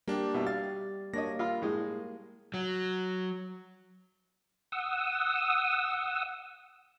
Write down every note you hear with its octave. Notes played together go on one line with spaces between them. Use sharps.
G3 A#3 D4 G4
B2 E4
F5 A6
A#3 D4 C#5 D#5 A#6
F4 F5 B5
A2 G#3
F#3
F#5 D#6 E6